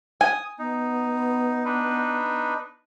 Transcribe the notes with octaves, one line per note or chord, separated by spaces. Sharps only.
G#5 D#6
B3 D#4
D4 D#4 B4